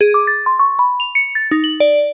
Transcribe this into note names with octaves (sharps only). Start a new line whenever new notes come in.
G#4
D6
A6
C6
C#6
B5
F7
C#7
A6
D#4
F#7
D5